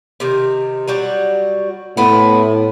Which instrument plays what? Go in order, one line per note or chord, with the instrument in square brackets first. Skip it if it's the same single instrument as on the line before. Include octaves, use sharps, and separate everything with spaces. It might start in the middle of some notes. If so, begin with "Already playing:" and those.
[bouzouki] C3 D#3
F#3 G3 F#4
[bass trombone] A2 [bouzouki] B3 C4 E4